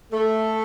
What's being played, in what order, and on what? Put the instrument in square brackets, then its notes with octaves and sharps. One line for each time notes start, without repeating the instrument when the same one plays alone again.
[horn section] A3